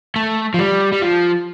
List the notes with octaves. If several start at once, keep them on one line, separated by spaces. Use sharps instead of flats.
A3
F3
G3
G3
F3